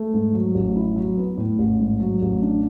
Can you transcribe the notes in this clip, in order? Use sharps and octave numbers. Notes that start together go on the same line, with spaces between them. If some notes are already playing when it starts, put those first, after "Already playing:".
Already playing: A3
G#2
F#3
A1
E4
F#3
B3
A2
A1
G#2
F#3
A1
D4